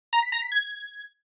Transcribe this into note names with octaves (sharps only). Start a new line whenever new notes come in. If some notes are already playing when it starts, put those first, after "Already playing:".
A#5
B6
A#5
B6
G#6